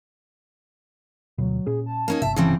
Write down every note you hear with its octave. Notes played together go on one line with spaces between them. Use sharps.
D2 B2 F#3
A#2 C#4 G#4
A5
A#3 C#4 D#4
G1 C3 E5 A5
C#3 E3 C4